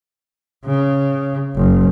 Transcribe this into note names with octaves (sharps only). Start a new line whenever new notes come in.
C#3
F#1